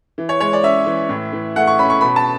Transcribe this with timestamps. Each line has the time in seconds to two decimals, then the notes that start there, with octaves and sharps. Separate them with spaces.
0.18 E3
0.29 C#5
0.40 G#3 C#5
0.53 D5
0.64 C#4 E5
0.86 E3
1.09 A2
1.33 E3
1.56 A3 F#5
1.67 C#6
1.79 C#4 B5
1.90 C#6
2.01 B2 B5
2.16 A5